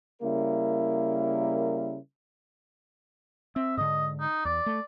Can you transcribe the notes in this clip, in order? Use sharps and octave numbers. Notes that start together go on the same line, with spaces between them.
C#3 G3 A#3 E4 A#4
C4 E5
G#2 D3 D#5
D#4
E2 D5
A3